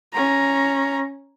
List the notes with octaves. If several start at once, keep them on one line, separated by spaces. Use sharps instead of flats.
C#4 A#5